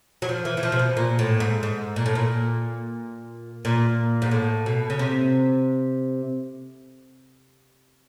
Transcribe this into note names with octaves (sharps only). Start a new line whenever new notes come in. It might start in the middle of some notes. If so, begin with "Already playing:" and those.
F#3
F3
E3
E3
F3
C3
B2
A#2
A2
G#2
G#2
A#2
A2
A#2
A#2
G#2
A2
B2
C#3
C3